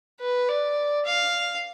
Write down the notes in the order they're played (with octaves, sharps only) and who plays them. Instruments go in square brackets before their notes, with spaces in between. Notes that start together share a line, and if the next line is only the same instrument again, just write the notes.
[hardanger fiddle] B4
D5
F5